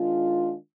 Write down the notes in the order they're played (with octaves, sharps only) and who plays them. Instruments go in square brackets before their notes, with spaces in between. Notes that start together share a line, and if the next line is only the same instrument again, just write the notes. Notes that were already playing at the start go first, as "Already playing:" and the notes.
Already playing: [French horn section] D#3 G#3 D4 F4